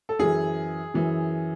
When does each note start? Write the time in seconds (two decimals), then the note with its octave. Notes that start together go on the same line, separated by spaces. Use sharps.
0.09 A4
0.19 F#2 E3 G#4
0.94 F#2 E3